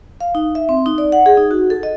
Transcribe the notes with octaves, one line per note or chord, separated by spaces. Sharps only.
F5
D#4
E5
C4
D#4
D5
F#5
G#4
D#4
F#4
A4
D#5